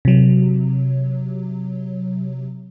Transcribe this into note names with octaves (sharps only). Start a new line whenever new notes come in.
C3 F#3